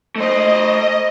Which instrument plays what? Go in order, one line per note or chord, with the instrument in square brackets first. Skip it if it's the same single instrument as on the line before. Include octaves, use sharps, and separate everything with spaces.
[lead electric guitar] A3 C5 [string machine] D#5